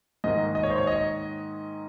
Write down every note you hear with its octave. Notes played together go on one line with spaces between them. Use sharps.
G#2 D#3 A#3 D#5
D#5
C#5
C5
C#5
D#5